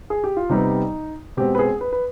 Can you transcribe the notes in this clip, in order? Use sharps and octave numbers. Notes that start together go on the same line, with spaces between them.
G#4
G4
F4
C3 G3 B3 D#4
B2 G#3 C4 G4
B4
G#4
B4
B4